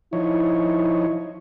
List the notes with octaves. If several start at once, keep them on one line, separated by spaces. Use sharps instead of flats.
F3 D#4 E4 C#5